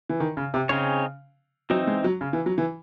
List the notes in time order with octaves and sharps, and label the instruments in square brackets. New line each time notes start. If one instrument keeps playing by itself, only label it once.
[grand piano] E3
D#3
C#3
C3
[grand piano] C#3 [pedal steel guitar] C4 D#4 G#4 C#5
[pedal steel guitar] E3 C4 D#4 [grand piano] F#3
[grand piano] G#3
F#3
C#3
E3
F#3
E3